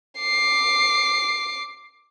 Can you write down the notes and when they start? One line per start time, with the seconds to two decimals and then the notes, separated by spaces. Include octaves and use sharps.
0.20 D6 C7